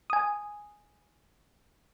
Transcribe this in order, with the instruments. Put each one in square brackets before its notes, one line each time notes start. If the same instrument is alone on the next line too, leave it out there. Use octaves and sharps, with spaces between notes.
[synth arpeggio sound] G#5 D#6